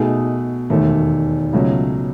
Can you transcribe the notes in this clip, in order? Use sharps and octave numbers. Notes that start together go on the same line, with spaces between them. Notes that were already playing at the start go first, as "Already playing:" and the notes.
Already playing: B2 A3 D#4 G#4
E1 D#2 D#3 A3
C#2 B2 F#3 A3 C#4